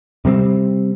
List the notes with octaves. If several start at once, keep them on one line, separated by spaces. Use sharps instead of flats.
C3 G3 A#3 C4